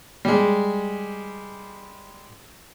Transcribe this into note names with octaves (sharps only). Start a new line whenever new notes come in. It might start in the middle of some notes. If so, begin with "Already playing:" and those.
G3 G#3